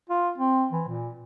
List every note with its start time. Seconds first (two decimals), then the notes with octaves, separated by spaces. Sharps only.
0.10 F4
0.38 C4
0.72 E3
0.88 A#2